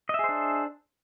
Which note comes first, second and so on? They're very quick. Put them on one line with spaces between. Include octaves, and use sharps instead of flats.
D#5 E5 G#4 C5 D4